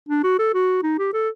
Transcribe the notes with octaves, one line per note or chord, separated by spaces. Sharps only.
D4
F#4
A4
F#4
D#4
G4
A4